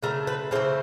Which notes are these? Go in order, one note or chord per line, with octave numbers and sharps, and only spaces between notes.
C#3 F#3 A3 C4 A#4
B4
C#3 E3 A3 C4 C5